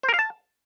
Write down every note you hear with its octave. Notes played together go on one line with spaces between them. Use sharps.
C5
A#4
F5
A5